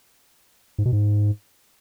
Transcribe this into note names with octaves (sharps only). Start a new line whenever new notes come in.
G#2
B2
G#2